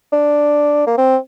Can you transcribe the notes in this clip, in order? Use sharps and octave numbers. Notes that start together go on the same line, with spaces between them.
D4
A#3
C4